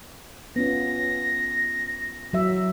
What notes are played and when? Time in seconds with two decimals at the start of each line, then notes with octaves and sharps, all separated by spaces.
0.56 B3 C#4 F4 A#6
2.33 F#3 E5